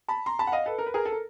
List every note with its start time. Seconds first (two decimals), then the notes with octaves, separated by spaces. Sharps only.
0.08 A5 B5
0.26 A#5 C6
0.39 A5 B5
0.47 F#5
0.52 D#5 F5
0.66 A4 B4
0.78 A#4
0.86 B4
0.94 G#4 A#4
1.05 A4
1.12 A#4